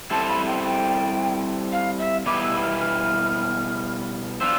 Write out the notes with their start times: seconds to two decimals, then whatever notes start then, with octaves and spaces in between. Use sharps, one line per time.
0.11 G3 C4 E4 A4 C5 A5
0.29 B5
0.46 G5
0.65 G5
1.72 F5
1.99 E5
2.26 B2 G3 B3 E4 B4 D6
2.43 E6
2.62 F6
2.80 F6
4.40 D4 F4 C5 E6